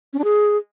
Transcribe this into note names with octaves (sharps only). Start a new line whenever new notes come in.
C#4
D4
G#4